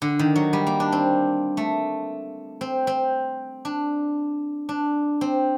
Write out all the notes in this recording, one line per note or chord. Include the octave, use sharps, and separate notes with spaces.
D3
D#3
F#3
G3
A#3
D4
C4
A3
C4
C4
D4
D4
C4